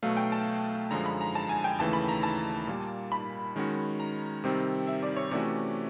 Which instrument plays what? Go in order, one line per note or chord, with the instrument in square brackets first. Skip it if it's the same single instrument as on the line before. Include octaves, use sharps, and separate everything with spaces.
[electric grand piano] B2 F#3 A3 [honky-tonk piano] F5
[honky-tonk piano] G5
A5
[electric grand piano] F#2 D3 F3 G#3 [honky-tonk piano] A#5
[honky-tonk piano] B5
A#5
A5
G#5
G5
[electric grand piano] D#2 C#3 E3 A3 [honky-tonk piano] A5
[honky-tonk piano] B5
A#5
A5
[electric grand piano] A#2 G3 A#3
[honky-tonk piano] B5
[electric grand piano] D#3 G#3 C#4 F#4
[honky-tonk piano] A#5
[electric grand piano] C3 D#3 G3 C4
[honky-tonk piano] E5
D5
C#5
[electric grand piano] C3 E3 A3 C#4 F#4 [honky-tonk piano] D5